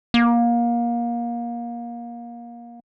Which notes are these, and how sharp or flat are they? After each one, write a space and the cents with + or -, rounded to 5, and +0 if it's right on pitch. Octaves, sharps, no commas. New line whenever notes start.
A#3 +25